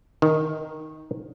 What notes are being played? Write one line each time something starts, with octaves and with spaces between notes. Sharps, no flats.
D#3